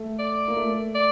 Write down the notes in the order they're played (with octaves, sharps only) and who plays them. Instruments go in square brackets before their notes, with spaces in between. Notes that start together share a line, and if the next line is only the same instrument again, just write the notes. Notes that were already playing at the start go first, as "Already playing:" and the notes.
Already playing: [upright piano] A3
[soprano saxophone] D5
[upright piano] A#3
A3
[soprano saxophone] D5